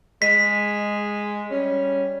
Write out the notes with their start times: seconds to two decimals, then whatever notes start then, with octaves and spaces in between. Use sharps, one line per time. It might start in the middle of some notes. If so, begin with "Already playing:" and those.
0.22 G#3 B6
1.51 G3 C#4